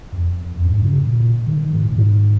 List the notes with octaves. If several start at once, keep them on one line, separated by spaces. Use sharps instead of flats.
F2
F2
G#2
C#3
A#2
D#3
D#3
G#2
A#2
G#2